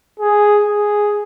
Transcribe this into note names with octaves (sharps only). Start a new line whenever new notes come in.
G#4
G#4